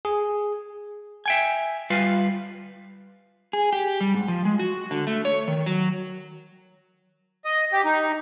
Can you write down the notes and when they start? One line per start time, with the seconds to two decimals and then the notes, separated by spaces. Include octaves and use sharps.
0.05 G#4
1.26 E5 G5 G#5
1.90 G3 F4 B4 F5
3.53 G#4
3.73 G4
4.01 G3
4.15 G#2
4.28 F3
4.45 G#3
4.59 F#4
4.91 D3
5.07 A3
5.25 C#5
5.48 D#3
5.66 F#3
7.45 D#5
7.72 G4
7.85 D#4